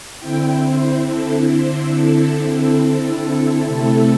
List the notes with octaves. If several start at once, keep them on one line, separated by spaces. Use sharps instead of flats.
D3 C4 E4 G5
C5
A4
C5
A4
C3 A3 C4 E4